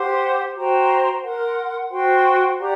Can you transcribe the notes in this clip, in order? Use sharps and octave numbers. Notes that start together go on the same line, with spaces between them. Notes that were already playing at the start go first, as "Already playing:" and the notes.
Already playing: G4 C5 F#5 C6
F#4 C5 G5 A#5
A#4 F#5 C6
F#4 C5 G5 C6
G4 D5 F#5 A#5